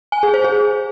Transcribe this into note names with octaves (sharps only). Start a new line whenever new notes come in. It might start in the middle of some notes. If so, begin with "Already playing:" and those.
G#5
G#4
C5
G#4